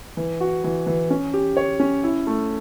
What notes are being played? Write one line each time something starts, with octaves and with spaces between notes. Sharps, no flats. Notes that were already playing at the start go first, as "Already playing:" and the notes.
E3
F#4
E3
E3
C#4
G4
C#5
C#4
E4
A3